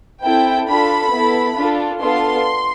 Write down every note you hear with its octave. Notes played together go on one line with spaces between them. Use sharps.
C4 E4 A4 G5
D4 F4 A4 B5
B3 E4 A4
D4 F4 A4
B3 D4 F4 A4 C6